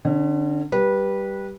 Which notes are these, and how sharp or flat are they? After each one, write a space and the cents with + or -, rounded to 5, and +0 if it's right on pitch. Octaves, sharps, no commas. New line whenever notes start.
D3 +25 C#4 -10
G3 +0 B4 -20